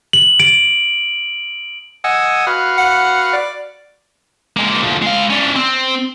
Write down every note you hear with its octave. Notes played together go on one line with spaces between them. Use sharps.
F#7
D7
D#5 F#5 G#5 E6
F#4 B4 F5
F#5
D5
G#3 A#3
D2 F3
G#3 F5
C#4 D4
C4